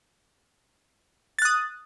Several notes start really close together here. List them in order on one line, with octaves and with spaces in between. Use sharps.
A6 F#6 D#6